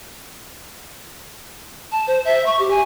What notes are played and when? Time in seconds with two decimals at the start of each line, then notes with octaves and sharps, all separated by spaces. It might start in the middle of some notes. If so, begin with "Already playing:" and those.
1.91 A5
2.07 C5
2.25 E5
2.46 C#6
2.59 G4
2.70 G#5